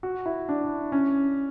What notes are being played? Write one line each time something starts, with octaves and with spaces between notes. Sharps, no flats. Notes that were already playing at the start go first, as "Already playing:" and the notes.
F#4
E4
D4
C#4